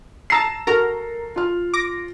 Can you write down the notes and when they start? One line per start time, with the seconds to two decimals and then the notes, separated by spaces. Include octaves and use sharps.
0.30 A5 A#5 E6 C7 E7
0.67 F#4 A4 A#4 A#5
1.36 F4 F6
1.74 D6 A#6